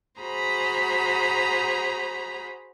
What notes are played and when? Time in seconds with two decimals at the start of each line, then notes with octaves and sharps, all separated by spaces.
0.20 F#4 G#4 C5 A#5 B5